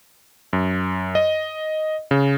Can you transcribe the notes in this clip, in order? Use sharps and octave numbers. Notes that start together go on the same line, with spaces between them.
F#2
D#5
C#3